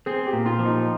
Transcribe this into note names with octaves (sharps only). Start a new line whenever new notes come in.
C4 G#4
G4
A#2
F4
F3
D#4